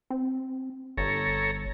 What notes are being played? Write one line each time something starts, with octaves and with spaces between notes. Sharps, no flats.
C4
G1 A4 C#5 A#5